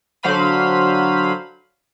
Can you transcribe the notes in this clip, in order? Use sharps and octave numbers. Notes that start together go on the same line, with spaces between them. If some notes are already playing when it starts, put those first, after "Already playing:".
D3 F#3 C5 F5 B5 D#7